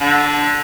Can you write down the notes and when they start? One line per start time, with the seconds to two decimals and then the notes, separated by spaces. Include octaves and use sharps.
0.01 D3